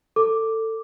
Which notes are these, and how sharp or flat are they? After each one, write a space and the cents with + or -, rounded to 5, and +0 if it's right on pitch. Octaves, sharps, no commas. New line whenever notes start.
A4 +20 D6 +0